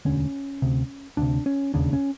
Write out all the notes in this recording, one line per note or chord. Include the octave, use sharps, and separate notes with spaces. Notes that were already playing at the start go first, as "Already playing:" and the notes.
E1 D2 D3 C#4
D2 C3
D2 C3 D4
C#4
E1 D#2 C#3 D4
C#4